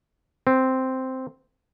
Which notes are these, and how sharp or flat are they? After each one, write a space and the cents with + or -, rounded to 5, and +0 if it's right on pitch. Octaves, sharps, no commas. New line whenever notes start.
C4 -5